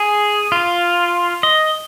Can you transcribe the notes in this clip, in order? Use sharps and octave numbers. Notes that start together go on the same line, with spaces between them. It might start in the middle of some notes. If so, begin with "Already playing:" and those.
Already playing: G#4
F4
D#5